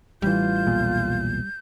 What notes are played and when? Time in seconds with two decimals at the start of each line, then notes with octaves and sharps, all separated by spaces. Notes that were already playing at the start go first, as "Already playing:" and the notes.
0.22 A1 E3 G3 F4 G6
0.67 B1 E2 A#2